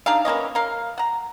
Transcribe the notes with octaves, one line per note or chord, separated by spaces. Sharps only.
D4 D#4 G#4 F5
E3 A#3 C#4 D#5
A#3 A#4 F5
F#5 A#5